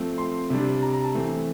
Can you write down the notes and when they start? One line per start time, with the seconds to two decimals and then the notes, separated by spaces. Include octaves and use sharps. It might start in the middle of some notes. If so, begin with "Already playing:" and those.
Already playing: F3 A3 C4
0.18 C6
0.50 C3 G3 D4
0.82 A#5
0.93 A#5
1.04 A5
1.15 E3 A3 C4